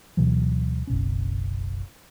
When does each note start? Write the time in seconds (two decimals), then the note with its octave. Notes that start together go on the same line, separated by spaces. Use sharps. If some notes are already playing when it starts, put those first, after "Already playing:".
0.17 D2 B2 E3 F#3
0.87 F#1 B1 C#4